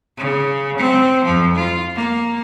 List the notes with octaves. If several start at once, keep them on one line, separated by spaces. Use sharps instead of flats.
C#3
C4
F2 F3
F4
A#3